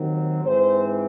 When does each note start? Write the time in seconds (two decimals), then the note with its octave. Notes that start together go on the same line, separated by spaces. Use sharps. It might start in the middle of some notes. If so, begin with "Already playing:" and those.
Already playing: D#2 D#3 F#3 C4
0.43 G#2 E3 C4 C5